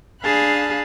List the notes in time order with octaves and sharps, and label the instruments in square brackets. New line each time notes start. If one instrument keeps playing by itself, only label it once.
[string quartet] D4 G#4 F5 A5 B5 F#6